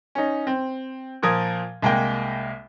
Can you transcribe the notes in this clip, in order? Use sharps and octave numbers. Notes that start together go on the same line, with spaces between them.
C#4 D#4
C4
A#2 F3 A#4 D#6 G#6
C2 G#3 A#3 G5